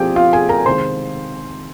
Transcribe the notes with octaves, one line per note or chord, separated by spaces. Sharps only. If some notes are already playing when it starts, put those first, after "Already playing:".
Already playing: F3 C4 G4 G#4 G5
F4 F5
G#4 G#5
A#4 A#5
C3 D#3 G#3 C5 C6